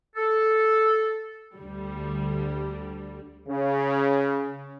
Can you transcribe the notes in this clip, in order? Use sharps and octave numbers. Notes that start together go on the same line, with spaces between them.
A4
D2 D3 G3
C#3